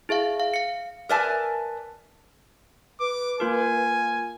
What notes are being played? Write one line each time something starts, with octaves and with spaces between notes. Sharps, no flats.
E4 G#4 E5 F5
F5
F5 C#7
A#4 B4 D5 E5 G#5 A5
B4 D6
A#3 F4 A#4 G#5